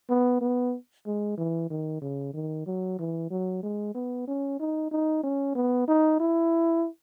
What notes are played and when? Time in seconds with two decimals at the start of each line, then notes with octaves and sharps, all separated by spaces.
0.09 B3
0.41 B3
1.06 G#3
1.37 E3
1.70 D#3
2.02 C#3
2.34 D#3
2.66 F#3
2.99 E3
3.30 F#3
3.63 G#3
3.95 B3
4.28 C#4
4.59 D#4
4.91 D#4
5.23 C#4
5.55 B3
5.88 D#4
6.20 E4